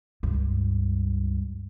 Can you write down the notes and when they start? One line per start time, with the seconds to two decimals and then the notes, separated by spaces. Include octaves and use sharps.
0.23 C#2 G2